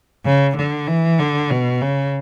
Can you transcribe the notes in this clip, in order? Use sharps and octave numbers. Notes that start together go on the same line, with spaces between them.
C#3
D3
E3
D3
B2
C#3